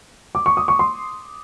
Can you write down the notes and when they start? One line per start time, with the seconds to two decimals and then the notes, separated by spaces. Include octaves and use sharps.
0.35 D6
0.46 C#6
0.57 D#6
0.68 C#6
0.79 C6